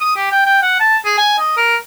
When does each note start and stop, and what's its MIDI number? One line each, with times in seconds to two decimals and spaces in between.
0.01 0.14 87
0.16 0.31 67
0.31 0.44 79
0.46 0.62 79
0.62 0.79 78
0.80 0.97 81
1.05 1.13 68
1.18 1.35 80
1.38 1.55 75
1.57 1.76 70